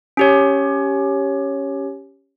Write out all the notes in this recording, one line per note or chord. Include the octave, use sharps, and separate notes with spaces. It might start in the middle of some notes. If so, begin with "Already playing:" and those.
C#4 G4 C#5